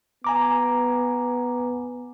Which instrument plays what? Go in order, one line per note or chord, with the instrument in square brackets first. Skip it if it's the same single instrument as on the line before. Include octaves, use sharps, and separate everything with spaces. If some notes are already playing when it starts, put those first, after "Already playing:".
[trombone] B3 [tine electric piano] G#5 A#5 D6